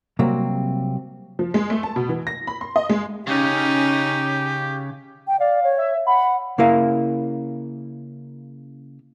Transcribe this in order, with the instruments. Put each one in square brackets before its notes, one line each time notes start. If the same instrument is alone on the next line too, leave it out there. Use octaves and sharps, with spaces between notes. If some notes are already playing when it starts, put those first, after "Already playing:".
[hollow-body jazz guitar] C3 F#3 G3 A#3 C4
[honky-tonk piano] F3
G#3
A3
A5
B2
E3
A#6
B5
C6
D#5
G#3
[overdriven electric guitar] C#3 [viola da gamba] C#4 D#4 [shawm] G4
[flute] G5
[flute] D5 [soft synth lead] F5
[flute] C#5
[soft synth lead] E5
[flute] F#5 [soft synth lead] B5
[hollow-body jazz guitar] C#3 A#3 E4 A#4 F5